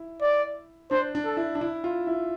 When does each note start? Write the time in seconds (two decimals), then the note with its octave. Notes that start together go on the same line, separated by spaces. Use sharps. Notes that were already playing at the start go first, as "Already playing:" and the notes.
Already playing: E4
0.22 D5
0.91 D4 C5
1.15 D4
1.25 A4
1.37 E4
1.55 D4
1.61 E4
1.84 F4
2.07 E4